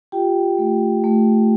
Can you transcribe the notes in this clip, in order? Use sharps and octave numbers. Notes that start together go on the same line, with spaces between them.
F4 G4 G5
A3
A3